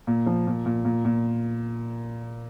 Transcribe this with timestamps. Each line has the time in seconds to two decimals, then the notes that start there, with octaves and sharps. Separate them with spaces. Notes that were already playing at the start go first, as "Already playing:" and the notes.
0.07 A#2
0.26 F3
0.47 A#2
0.66 A#2
0.85 A#2
1.05 A#2